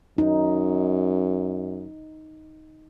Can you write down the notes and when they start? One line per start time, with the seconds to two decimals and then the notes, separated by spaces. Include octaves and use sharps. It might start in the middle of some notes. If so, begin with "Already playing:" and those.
0.18 F#2 D#4